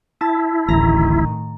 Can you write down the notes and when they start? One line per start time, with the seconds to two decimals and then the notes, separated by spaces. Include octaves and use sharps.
0.21 E4 A5
0.68 D1 A1 A2 D#3 A#5